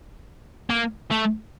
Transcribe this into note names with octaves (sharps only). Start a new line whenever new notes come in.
A#3
A3